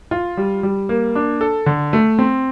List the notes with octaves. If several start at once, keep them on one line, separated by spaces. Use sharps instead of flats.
F4
G3
G3
A#3
D4
A4
D3
A3
C4